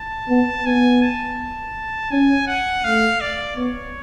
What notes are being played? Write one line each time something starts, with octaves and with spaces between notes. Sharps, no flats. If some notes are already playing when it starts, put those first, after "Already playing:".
Already playing: A5
B3
B3 G#5
A5
C#4 G#5
F#5
A3 F5
D5
B3 C#5